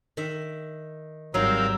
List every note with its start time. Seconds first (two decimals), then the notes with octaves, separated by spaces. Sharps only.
0.17 D#3 E5
1.34 G#1 F#3 G3 C4 D#4 A#4 F5 E6